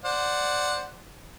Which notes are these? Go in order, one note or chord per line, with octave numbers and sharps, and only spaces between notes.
C5 D5 F#5